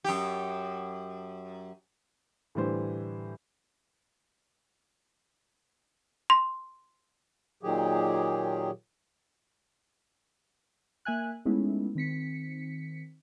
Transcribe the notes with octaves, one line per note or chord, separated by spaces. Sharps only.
F#2 G4
A2 D3 E3 G3 C5
C6
A#2 D#3 F#3 G4 G#4
A#3 E5 G#5 F#6
G#3 A3 B3 C#4 D#4 E4
D#3 C4 B6 C#7